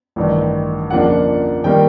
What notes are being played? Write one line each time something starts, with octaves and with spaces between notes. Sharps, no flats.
A1 G2 D#3
F2 C#3 F3 A#3 D4 F#5
D#3 G3 A#3 G5